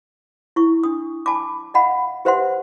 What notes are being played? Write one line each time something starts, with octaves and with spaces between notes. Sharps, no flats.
E4 C#6
D4 D#6
G#5 A5 B5 D6
D#5 F5 F#5 B5
G4 B4 C5 E5 F#5 C6